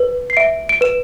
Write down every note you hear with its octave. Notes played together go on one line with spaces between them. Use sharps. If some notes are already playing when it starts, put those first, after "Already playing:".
Already playing: B4
C7
E5 D7
D7
B4 E7